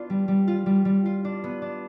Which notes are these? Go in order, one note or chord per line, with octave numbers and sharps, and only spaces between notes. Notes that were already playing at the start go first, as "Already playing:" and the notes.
Already playing: B3 D4 F4
G3
G3
F4
G3
G3
F4
D4
B3
D4